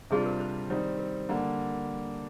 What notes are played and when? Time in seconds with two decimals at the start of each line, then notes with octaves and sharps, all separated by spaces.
0.10 C3 G3 D4 F4 G#4
0.26 A#4
0.40 C5
0.70 D#3 G3 C4 D#4
0.99 A#4
1.29 D3 G3 A#3